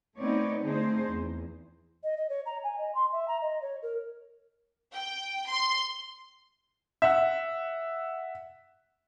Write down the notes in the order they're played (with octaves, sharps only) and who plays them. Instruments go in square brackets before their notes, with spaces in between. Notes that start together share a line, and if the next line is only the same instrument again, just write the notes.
[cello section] A3 B3 C4 D#4 C#5 D5
D3 A3 C4 D#4 G#4 C5
E2
[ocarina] D#5
D#5
C#5
A#5
G#5
D#5
C6
E5
A#5
D#5
C#5
A#4
[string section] G5
C6
[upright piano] E5 F#5